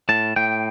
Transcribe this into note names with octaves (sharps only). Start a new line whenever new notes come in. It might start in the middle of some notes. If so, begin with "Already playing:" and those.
A2 A5
A2 G5